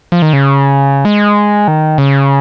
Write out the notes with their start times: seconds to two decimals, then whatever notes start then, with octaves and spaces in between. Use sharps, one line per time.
0.12 F3
0.22 D#3
0.33 C#3
1.05 G#3
1.68 D#3
1.98 C#3